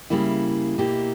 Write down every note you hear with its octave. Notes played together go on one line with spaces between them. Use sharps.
C#3 G3 A#3 E4
B2 A#3 E4 G4